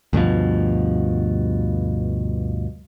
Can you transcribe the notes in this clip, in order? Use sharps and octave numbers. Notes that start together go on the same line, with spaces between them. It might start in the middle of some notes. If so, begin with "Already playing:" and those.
D2 G2 B2 F3